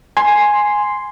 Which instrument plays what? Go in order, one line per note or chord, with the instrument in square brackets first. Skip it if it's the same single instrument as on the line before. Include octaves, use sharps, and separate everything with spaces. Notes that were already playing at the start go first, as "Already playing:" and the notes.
[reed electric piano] G#5 [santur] C6